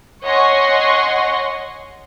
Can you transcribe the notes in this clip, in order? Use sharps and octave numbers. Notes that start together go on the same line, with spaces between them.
C#5 D#5 F#5 G#5 C6 C#6